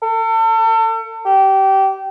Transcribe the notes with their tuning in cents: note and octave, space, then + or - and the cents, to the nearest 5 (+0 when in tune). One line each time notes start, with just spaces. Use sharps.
A4 +35
G4 -20